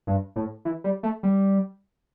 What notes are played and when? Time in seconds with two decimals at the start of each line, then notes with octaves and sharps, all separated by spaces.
0.07 G2
0.36 A2
0.65 E3
0.84 G3
1.03 A3
1.23 G3